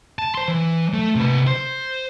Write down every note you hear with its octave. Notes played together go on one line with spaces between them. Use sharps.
A5
C5 C6
E3
A3
C3 B4
C5